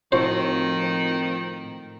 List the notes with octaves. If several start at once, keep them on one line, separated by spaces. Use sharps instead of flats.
A2 D#3 F3 C4 F#4 C5 F#5